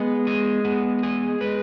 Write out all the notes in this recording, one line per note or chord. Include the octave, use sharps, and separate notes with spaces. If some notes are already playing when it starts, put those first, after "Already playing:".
Already playing: G#3 B3
G#4
B3
G#4
G#3 B4